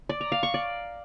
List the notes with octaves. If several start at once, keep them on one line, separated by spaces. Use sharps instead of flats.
D5
A#5
F5
C#6
D5